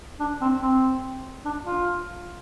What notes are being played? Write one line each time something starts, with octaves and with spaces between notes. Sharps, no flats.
D4
C4
C4
D4
F4